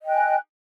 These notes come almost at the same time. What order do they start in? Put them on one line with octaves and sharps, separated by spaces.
D#5 G5 F#6 G#5